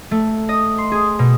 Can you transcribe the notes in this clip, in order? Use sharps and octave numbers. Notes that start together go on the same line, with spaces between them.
A3
D#5
C6
G#4
B2